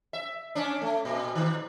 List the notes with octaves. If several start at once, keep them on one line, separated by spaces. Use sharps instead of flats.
E5
C#4 D4
A3
A#2
D#3